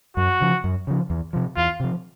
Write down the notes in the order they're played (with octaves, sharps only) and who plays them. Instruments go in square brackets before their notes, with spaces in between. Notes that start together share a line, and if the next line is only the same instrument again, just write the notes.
[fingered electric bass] F#2 [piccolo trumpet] F#4
[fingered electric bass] C#3 F3
F#2
C#3 F3
E2
C3 F3
[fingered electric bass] E2 [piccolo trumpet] F4
[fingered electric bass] C3 F3